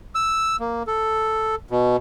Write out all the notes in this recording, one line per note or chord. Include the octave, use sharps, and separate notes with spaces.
E6
A#3
A4
B2